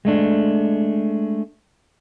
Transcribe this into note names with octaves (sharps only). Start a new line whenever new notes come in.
G#3 A3 D4